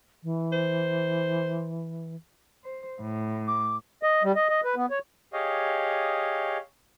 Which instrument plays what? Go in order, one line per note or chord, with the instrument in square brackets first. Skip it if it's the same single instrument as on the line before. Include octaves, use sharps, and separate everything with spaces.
[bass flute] E3
[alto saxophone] C5
[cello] C5
A2
[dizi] D6
[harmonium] D#5
G3
D#5
D#5
B4
B3
C#5
[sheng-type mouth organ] G4 G#4 C#5 D#5 F5